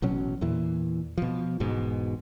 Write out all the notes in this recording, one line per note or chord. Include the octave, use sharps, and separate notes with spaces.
A1 B2 F#3 C#4
E2 A#2 E3
B2 F3
E1 G#2 B2 G#3